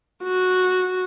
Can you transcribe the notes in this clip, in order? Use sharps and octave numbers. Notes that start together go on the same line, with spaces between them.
F#4